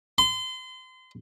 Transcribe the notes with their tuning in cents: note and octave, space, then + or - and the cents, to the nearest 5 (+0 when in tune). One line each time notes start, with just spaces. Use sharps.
C6 -30